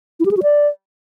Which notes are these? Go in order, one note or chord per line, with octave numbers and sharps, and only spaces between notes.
E4
G4
G#4
F#4
D5